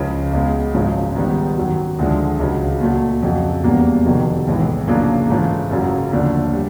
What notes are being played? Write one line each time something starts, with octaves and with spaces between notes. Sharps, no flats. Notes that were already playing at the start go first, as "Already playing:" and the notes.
Already playing: C#2 C#3 F3
C#2 B2 G#3
G#1 F#2 C#3 F3 G#3
G#2 D#3 G3 B3 D#4
F#2 D#3 F#3
D2 D3 F3 G#3
C#2 C#3 F#3
A#2 F#3 A3
F2 C#3 F#3
E1 E2 B2 G3 A#3
F1 F2 C3 D#3 F#3
B1 A2 E3 G#3
F#2 C#3 F3 A#3 D4
G#2 E3 A3 C#4 F4
F#1 F#2 C#3 F#3
D#2 D3 F3 A3
G3